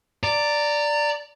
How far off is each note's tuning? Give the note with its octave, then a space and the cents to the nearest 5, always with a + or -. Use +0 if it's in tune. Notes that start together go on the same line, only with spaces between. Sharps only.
D5 +0 A#5 -25